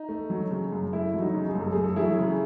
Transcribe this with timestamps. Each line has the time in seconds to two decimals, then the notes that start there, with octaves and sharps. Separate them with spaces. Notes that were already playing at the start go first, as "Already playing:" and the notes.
Already playing: D#4
0.09 A3
0.30 F#3
0.51 C#3
0.72 F#2
0.93 A3 E4
1.14 F#3
1.20 D#4 F#4
1.34 C#3
1.49 G#4
1.55 F#2 A4
1.73 A3 G#4
1.84 A4
1.96 F#3 E4 G#4
2.19 C#3